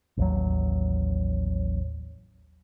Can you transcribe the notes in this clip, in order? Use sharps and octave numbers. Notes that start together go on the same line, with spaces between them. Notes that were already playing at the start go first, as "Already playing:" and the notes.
A1 D#2 F#3